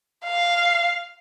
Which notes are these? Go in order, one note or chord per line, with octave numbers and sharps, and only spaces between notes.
F5